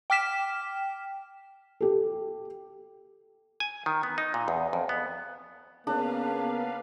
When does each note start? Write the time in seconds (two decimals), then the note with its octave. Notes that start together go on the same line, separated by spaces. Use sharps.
0.10 G5 D6 F6 B6 E7
1.81 G4 A4
3.60 G#5
3.86 D#3
4.03 B3
4.18 D#4
4.34 A#2
4.48 E2
4.73 F2
4.89 B3
5.87 C#3 A#3 B3 D4 B4 F5